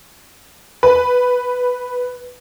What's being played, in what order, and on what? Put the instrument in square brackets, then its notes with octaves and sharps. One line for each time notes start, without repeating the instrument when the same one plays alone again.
[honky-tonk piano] B4